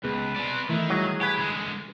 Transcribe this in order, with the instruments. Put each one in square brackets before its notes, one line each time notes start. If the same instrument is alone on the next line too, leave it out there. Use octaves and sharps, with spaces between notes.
[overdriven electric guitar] C#2 [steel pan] B3 G#4 [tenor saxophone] B4
[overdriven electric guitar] C4 D5
[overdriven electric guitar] D#3 [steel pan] E3 A3 [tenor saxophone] E4
[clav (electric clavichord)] F#3 [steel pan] G3 E4 [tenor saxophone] G#4
[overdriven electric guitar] G4 [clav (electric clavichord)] B4 G#5
[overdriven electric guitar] D3 G#3